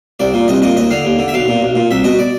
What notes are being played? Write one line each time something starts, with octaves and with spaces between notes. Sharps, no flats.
C2 D5
A#2
C2 D#5
A#2 D#5
D#2 D#5
D3 F5
D#2
D3
E5
B1 F5
A#2
B1
A#2
C2 E5
B2 D#5
D5